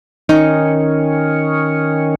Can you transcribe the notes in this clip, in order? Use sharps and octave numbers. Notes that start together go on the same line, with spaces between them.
D#3 C#4 D#4